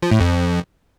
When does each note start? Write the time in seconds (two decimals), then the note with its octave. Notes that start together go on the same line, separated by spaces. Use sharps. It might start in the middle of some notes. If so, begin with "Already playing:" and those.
0.03 F3
0.11 A2
0.20 F2